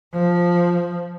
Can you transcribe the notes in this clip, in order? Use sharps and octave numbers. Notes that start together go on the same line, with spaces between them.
F3